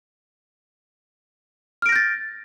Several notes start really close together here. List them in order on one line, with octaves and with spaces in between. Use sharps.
F6 D7 A#6 G6 A6